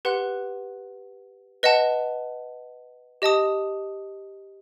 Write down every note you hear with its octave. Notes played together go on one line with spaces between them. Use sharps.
G4 B4 F#5 C6 F#6
B4 D#5 F#5 A5
G4 D#5 A5 D#6